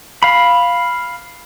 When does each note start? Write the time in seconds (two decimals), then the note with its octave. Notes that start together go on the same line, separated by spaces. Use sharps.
0.23 F5 B5